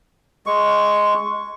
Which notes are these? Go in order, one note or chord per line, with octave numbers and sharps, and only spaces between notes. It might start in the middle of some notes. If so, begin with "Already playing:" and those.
G#3 C#6